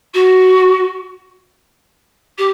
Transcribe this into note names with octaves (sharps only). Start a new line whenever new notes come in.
F#4
G4